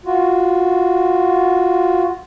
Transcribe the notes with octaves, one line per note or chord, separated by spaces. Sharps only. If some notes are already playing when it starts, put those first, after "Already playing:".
F4 F#4